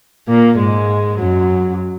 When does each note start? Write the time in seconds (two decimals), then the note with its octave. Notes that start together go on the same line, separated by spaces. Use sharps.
0.27 A#2 A#3
0.58 G#2 G#3
1.18 F#2 F#3